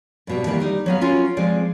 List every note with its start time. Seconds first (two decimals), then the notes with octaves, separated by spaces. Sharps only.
0.27 G2 B2 G3
0.46 D#3 E3 G3 A#3 B4
0.60 G3 D#4
0.86 F#3 B3 F5
1.01 C#4 F4 F#4 A#4
1.37 F3 G#3 C4 D5